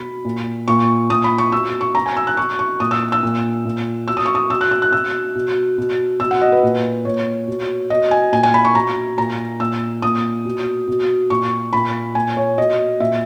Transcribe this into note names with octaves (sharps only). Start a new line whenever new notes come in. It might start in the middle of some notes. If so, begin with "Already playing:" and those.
Already playing: B2 B5
A#2
A#2 C#6
A#2 D#6
B5
C#6
B2 E6
C#6
B2 A#5
G#5
E6
F#6
B2 C#6
C#6
A#2 D#6
E6
E6
A#2
A#2
B2 E6
D#6
C#6
D#6
B2 E6
F#6
E6
F#6
B2 E6
B2
B2
B2 E6
F#5
D#5
B4
A#2
A#2 C#5
B2
B2 D#5
G#5
A#2 G#5
G#5
B5
C#6
B2 A#5
A#2 A#5
A#2 E6
A#2 D#6
B2
B2
A#2 C#6
A#2 B5
A#2 G#5
C#5
B2 D#5
A#2 E5